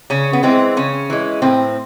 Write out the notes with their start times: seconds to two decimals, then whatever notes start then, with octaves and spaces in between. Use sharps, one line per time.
0.10 C#3 C#4
0.33 B3
0.43 E3 G#3 C4
0.77 C#3 C#4
1.10 E3 G#3
1.42 A2 C4